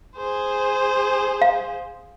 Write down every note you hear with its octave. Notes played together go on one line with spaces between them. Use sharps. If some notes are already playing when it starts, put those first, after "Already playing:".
G#4 C5
F5